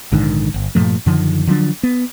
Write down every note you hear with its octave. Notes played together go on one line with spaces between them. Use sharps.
A#1 G#2 D3 D#3
G1
G2 A#2 F3 A3
F#2 D3 D#3 F3
D3 F3 F#3 D4
B3